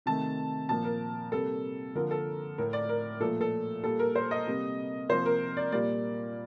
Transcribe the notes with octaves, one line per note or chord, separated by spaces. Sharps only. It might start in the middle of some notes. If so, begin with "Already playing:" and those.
C3 D#3 A3 A5
A#2 F3 A#3 A5
A#4
C3 G3 A#3 A4
D3 F3 A#3 A#4
A4
A2 A3 A#4
D5
A#4
A#2 F3 A3 A4
A4
A#2 G3 A#3 A4
A#4
C5
D#5
C3 G3 A#3
C3 F3 A#3 C5
A#4
D5
A#2 G3 A#3 D5